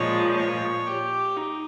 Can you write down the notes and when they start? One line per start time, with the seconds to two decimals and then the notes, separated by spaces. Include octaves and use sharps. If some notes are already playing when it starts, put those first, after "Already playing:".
Already playing: A#2 F3 G#3 C#5
0.37 C#5
0.87 G4
1.37 D#4